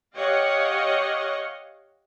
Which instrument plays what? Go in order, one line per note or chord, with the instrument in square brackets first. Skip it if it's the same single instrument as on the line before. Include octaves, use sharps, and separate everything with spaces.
[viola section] G4 C#5 D#5 F5 F#5